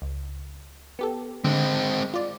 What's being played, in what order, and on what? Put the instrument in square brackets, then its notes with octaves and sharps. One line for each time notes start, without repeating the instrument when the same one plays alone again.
[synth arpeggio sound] C#2
B3 G4 A4
[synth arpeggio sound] D3 [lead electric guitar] G#3 C4
[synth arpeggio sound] F4 D5